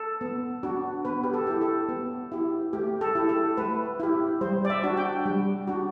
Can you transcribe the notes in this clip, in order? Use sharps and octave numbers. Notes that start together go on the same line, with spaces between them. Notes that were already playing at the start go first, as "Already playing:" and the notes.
Already playing: A4
B3
D4 F#4
B3 B4
G4
A4
E4 G4
A4
B3
E4 G4
A3 G4
A4
E4 G4
A4
A3 B4
E4 G4
G3 C5
D5
E5
D4 F#4
G5
G3
D4 F#4